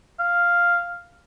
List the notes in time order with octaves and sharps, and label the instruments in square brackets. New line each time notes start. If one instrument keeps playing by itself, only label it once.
[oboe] F5